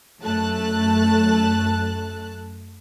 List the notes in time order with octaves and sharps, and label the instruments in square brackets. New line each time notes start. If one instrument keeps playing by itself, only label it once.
[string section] F#2 A3 A5 F#6